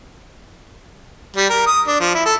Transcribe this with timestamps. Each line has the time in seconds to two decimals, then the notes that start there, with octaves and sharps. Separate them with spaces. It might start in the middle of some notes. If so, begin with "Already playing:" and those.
1.36 G3
1.50 A#4
1.67 D#6
1.87 D4
2.00 F3
2.14 E4
2.26 A4